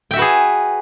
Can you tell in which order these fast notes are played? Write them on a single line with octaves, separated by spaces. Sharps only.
G5 E5 F#4 B4 G#4